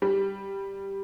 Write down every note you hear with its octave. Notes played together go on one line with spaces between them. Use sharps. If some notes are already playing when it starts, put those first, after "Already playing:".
G3